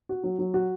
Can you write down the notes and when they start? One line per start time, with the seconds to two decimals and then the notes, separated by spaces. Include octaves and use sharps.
0.09 F#4
0.24 F#3
0.39 F#3
0.54 F#4